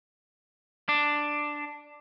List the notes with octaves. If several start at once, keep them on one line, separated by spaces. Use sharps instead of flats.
D4